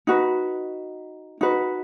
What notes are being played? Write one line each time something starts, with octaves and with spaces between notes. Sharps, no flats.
D#4 F#4 B4
D#4 F#4 B4